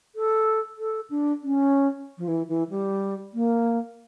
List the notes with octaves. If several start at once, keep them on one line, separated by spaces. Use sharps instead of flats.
A4
A4
D4
C#4
F3
E3
E3
G3
A#3